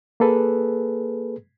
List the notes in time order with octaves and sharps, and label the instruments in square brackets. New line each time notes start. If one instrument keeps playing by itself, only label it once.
[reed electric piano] A#3 G#4 A4 B4